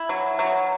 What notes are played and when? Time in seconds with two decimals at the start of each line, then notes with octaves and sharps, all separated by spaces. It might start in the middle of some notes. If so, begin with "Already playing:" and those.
Already playing: E4
0.09 F#3
0.39 F#3